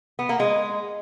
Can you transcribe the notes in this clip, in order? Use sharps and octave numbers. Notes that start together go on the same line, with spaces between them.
B3
A#3
G#3